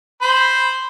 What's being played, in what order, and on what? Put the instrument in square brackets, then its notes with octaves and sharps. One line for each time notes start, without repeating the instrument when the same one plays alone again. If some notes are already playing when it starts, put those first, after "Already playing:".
[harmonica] C5 B5